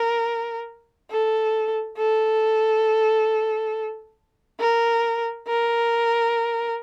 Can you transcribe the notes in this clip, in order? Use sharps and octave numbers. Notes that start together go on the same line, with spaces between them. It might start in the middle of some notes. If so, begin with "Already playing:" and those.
Already playing: A#4
A4
A4
A#4
A#4